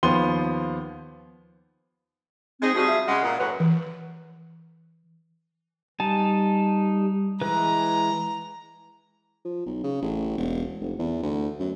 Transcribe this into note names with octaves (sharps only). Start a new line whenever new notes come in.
D#2 F3 B3 C6 D#7 G7
G#3 C4 D#4 G#4
F3 G3 F#4 G#4
E5
C#3 G#3 F#5
A#2
F#2 A2 F#3 B4
E3
G3 D#4 G#5 A5
E3 G#3 B4 A#5
F3
B1
C#3
A1
E1
F1
E2
D2
F#2